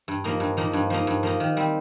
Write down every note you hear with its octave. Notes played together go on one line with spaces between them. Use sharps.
G2
F3 A#3 D#4
G2
F3 A#3 D#4
G2
F3 A#3 D#4
G2
F3 A#3 D#4
D#3
G3 C4